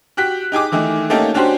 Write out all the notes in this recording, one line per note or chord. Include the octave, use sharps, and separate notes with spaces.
F#4 G4 F#6 B6
D#4 G4 G#4 D6
D#3 E3 A3 D#4
A3 A#3 C#4 D#4 G4 A4
C#4 D4 F#4 G4 C5